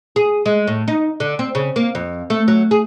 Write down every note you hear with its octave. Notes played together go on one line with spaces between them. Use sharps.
G#4
G#3
A2
D#4
D3
C4
C#3
A#3
F2
A3
F#3
G#4